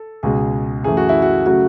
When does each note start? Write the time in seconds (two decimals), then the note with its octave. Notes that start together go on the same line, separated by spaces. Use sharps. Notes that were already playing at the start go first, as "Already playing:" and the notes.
Already playing: A4
0.23 C#2 B2 G#3 G#4
0.84 F#2 E3 A3 G#4
0.97 F#4
1.09 E4
1.22 F#4
1.46 C#3 F#3 A3 F#4